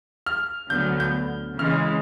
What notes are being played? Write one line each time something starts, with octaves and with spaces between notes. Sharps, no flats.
F6
D2 D3 F#3 B3 G6
G6
C#3 E3 G#3 F6